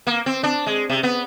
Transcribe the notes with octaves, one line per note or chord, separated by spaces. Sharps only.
A#3
C4
D4
G#3
C3
B3